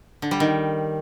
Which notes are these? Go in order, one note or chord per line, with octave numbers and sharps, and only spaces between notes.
D3
G3
D#3